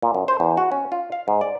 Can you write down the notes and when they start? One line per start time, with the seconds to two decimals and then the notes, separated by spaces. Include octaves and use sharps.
0.02 A#2
0.14 F#2
0.28 C5
0.40 E2
0.57 F#4
0.72 C#4
0.92 F4
1.12 F5
1.28 G#2
1.41 D5